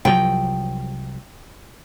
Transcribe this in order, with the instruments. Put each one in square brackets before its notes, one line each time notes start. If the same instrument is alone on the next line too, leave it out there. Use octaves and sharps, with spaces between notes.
[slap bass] C2 F3 F#3 [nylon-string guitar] G5